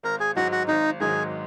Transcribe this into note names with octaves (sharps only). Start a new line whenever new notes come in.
G#1 A#4
G#4
G#2 F#3 D#4 F#4
F#4
G#1 D#4
G#2 D#3 F#3 D#4 G#4